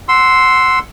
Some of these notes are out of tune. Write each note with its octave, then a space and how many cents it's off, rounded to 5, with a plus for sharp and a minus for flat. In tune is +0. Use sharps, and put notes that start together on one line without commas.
F#5 +0 C6 +0 E6 +0